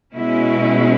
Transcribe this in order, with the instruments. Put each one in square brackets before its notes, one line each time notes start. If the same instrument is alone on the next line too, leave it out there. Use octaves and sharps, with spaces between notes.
[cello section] B2 G#3 C#4 E4